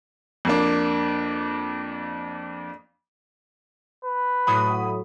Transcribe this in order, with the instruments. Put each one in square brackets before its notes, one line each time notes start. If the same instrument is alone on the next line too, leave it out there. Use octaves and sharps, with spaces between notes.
[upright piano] F2 A#3 D4
[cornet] B4
[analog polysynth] A2 F#3 [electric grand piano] B5 D#6